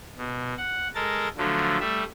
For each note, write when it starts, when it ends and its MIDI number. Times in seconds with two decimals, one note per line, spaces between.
0.17 0.54 47
0.58 0.88 78
0.95 1.28 56
0.95 1.28 69
0.95 1.28 70
0.95 1.28 93
1.37 1.78 50
1.37 1.78 53
1.37 1.78 54
1.37 1.78 57
1.80 2.04 55
1.80 2.04 57
1.80 2.04 76